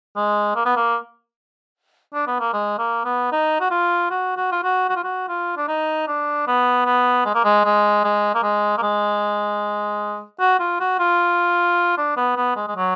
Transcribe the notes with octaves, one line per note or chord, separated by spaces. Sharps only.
G#3
A#3
B3
A#3
D4
B3
A#3
G#3
A#3
B3
D#4
F#4
F4
F#4
F#4
F4
F#4
F#4
F4
F#4
F4
D4
D#4
D4
B3
B3
G#3
A#3
G#3
G#3
G#3
A#3
G#3
A#3
G#3
F#4
F4
F#4
F4
D4
B3
B3
G#3
G#3
F#3